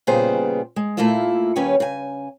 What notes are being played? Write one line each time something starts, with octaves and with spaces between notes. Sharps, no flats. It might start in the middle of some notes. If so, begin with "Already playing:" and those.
A#2 C#3 G3 B3 G#4 C5
G#3
A#2 A3 A#3 E4 F4 E5
D#2 G3 C#4 B4 C#5 G#5
C#3 G#5